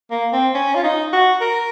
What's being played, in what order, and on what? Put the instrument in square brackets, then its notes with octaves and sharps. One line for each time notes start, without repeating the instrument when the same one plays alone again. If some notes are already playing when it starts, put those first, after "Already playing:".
[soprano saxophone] A#3
C4
C#4
F4
D#4
F#4
A#4